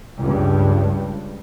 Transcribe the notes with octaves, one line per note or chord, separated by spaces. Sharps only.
C#2 G2